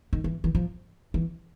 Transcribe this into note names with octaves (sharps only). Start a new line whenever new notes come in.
D#3
E3
E3
F3
E3